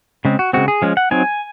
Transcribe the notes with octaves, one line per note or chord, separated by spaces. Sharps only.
C#3 G#3 C4
F#4
C#3 G#3 C4 F#4
G#4
F3 G#3 C#4
F#5
F#3 C4 D#4 G#5